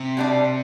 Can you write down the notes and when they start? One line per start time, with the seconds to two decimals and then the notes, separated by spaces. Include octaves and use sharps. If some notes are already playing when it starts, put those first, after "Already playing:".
Already playing: C3
0.17 B2 G3 D4